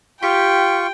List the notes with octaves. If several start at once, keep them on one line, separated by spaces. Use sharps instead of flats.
F4 G4 G5 C#6